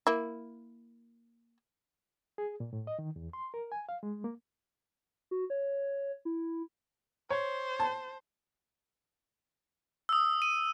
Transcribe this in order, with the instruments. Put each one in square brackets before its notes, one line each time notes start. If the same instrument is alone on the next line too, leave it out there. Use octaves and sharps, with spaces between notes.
[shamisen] A#3 E4
[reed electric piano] G#4
A#2
A2
D#5
D#3
E2
C6
A#4
G#5
F5
G#3
A#3
[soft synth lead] F#4
C#5
E4
[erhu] C5 [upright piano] C#5
[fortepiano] A5
[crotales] D#6 E6
D#7